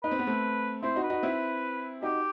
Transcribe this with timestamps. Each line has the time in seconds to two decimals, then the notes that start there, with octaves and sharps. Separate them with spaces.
0.03 D#4 B4
0.11 C4
0.19 B3
0.27 A3 C4
0.83 C4 E4 C5
0.96 D#4 F#4
1.03 B4
1.10 D#4 F#4
1.23 C4 E4
2.02 D#4 F#4 G4